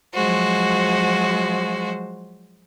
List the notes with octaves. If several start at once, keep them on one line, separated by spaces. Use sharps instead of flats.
F3 F#3 G#3 F#4 C5